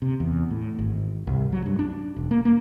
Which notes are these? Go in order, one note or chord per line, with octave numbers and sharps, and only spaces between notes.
C3
E2
A2
G#1
C2
F#3
G2
D4
E1
A#3
A#3